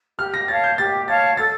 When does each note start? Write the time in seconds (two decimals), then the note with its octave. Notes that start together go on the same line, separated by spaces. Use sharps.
0.19 G4 F6
0.34 A#6
0.48 C#5 F5 A5 A6
0.64 G6
0.78 G4 A6
1.08 C#5 F5 A5 A6
1.37 A4 A6